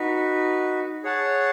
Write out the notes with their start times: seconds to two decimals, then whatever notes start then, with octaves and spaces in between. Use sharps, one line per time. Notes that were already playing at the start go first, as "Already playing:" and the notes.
Already playing: D#4 F#4 B4
1.03 G#4 C#5 F#5 A5